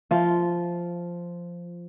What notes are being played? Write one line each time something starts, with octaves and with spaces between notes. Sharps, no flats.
F3 F4